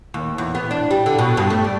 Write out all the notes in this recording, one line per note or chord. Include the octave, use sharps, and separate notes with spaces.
D#2
E2
B3
D4
G3
D3
B2
G2
A3
D5